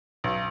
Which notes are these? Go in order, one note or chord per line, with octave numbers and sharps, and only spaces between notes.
B1